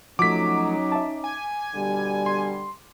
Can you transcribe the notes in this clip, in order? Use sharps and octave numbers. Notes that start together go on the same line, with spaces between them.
F3 F#3 A3 C#4 D#4 D6 B6
E5 A5
G#5
B2 D3 G3
C6